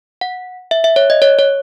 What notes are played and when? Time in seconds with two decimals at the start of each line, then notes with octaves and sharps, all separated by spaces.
0.21 F#5
0.71 E5
0.84 E5
0.96 C#5
1.10 D#5
1.22 C#5
1.39 C#5